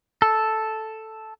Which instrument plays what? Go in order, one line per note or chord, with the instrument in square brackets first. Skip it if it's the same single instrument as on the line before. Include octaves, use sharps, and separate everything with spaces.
[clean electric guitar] A4